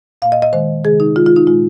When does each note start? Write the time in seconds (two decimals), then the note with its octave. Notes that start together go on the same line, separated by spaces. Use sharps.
0.22 A#2 F5
0.25 A#3
0.32 D#5
0.42 D#5
0.53 D#3 G#3 C5
0.84 C3 D#3 G#3 G#4
1.00 D#4
1.16 D#3 G#3 F4
1.26 F4
1.36 D#4
1.47 A#2 G#3 F4